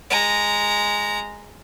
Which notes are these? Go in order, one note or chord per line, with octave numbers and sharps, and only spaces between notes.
G#3 A#5